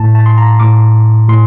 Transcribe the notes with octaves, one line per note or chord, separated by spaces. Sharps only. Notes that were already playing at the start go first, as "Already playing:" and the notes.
Already playing: A2 A5
A5
C6
A#5
A2 D6
A2 C6